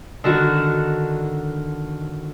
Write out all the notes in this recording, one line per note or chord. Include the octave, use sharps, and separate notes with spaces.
D3 D#3 F#4